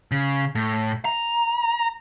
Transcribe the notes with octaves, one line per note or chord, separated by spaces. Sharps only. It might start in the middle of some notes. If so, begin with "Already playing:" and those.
C#3
A2
A#5